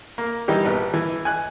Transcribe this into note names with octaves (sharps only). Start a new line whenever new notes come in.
A#3
E3 G3 D#4 G4
A#1 B3
E3
G#5 F#6